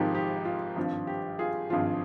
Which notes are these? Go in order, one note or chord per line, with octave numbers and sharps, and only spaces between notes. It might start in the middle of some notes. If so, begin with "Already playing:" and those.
Already playing: G#1 G#2 F3 G4 A#4
G4
F4
G#1 G2 F3
G4
F4 G#4
G#1 G2 F3 F4